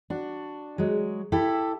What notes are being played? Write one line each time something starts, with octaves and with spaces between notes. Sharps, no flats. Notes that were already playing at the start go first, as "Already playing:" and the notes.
D4 F#4
F#3 G#3
E4 G4 A4